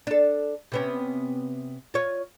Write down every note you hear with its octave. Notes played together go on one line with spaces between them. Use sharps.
D4 A4
C3 B3 C#4
F4 C#5